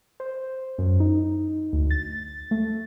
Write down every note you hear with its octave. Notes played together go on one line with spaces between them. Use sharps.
C5
F#2
D#4
D2
A6
A3